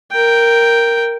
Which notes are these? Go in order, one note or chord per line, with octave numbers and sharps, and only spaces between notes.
A#4 G5